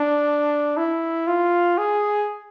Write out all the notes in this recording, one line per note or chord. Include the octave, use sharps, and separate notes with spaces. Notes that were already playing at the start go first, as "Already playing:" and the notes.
Already playing: D4
E4
F4
G#4